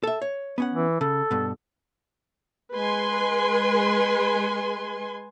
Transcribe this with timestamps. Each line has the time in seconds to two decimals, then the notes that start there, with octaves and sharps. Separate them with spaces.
0.03 A4 E5
0.22 C#5
0.58 B3 C#4 F#5
0.74 E3
1.01 C#3 A4
1.31 G2 B2
2.73 G#3 B4 G#5 C6